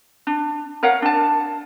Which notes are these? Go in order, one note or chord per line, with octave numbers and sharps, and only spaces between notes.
D4
A#4 C#5 F5 F#5
D4 A5